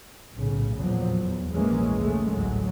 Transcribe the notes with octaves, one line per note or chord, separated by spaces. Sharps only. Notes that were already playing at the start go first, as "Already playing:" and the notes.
B1 A2 C#3
E2 A#2 F3 F#3
E2
A#1 G#2 E3 G#3 A#3 C#4
A1 D#2 C#3 G#3 A3
A1 D2 G#2 F#3 G#3